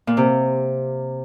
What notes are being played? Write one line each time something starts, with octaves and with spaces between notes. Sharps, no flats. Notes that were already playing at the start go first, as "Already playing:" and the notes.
A#2
C3